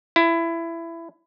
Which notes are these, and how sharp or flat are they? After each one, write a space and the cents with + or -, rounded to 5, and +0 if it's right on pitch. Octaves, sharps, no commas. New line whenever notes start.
E4 +20